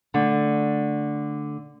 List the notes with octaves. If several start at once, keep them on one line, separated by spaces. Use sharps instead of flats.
D3 A3